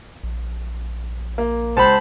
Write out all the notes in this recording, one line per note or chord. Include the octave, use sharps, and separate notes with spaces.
A#1
A#3
C#2 C5 A5 B5 E7